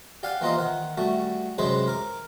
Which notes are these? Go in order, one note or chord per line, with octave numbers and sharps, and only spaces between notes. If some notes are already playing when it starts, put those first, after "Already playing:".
G4 D5 F5 F#5 G#5
E3 A#3 F4 C5 D#5
D#3 F#5
G3 A3 F#4
F#2 C3 G#3 G#4 B4 C5
A#4 D6